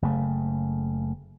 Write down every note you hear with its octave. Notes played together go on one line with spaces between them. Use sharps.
F#1 C#3 A3